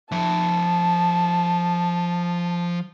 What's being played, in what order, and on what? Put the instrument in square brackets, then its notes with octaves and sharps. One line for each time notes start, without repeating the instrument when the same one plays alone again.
[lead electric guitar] F3 E5 [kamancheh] A5